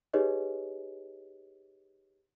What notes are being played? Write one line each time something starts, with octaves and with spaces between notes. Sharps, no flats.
D#4 G4 G#4 B4 C#5 D#5